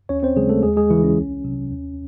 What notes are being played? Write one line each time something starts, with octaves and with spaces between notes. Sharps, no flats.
D#2 C#4 C#5
C4 C5
C#3 F#3 G#3 G#4
A3 A4
D#2 G#3 G#4
G#3 G#4
C#3 E3 G#3 E4
C#4
C2
C3 F#3
D#2